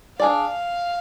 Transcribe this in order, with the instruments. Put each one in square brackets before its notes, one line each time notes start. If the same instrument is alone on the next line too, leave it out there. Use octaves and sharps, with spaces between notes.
[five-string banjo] D4 G#4 D5 [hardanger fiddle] F5